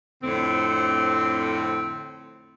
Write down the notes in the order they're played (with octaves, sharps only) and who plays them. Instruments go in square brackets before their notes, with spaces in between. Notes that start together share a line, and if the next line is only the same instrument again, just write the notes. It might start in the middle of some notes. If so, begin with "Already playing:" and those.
[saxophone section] F2 A2 D3 C4